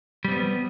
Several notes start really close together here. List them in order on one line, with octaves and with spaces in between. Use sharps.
G3 C4 B3